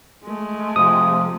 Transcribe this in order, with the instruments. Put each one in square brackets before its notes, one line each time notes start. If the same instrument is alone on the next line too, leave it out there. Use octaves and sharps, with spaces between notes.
[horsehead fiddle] G#3 A3
[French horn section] C3 F3 [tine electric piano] D#6